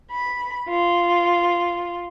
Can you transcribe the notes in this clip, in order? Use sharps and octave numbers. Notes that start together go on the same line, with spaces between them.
B5
F4